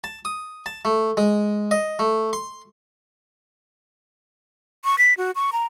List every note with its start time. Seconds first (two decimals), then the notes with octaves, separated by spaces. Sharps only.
0.04 A5
0.25 D#6
0.66 A5
0.85 A3
1.17 G#3
1.71 D#5
1.99 A3
2.33 C6
4.85 C#6
4.98 B6
5.17 F#4
5.35 C#6
5.53 A#5